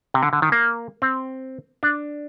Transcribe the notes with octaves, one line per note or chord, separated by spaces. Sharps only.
C3
D3
D3
D#3
A#3
C4
D4